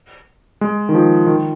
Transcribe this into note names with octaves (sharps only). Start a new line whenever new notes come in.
G#3
D#3
F3
D#3